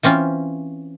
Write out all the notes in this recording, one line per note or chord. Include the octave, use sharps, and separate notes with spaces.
E3 C4 C#4 F4